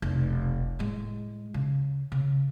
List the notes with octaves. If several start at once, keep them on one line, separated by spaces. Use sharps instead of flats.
F1 B1
A2 G#3
C#3
C#3